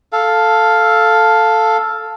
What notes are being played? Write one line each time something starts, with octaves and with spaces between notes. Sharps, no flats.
A4 F5